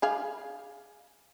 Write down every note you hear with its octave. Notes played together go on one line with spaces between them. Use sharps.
D4 G#4 F5